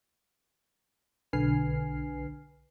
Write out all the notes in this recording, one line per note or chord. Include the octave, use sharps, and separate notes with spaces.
B1 D3 B4 G#5 F6 C7